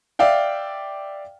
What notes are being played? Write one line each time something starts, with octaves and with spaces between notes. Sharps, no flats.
D5 E5 F5 G5